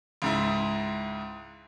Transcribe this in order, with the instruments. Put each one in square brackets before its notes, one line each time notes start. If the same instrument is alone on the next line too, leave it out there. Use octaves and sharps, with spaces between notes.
[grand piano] C#2 G#2 E4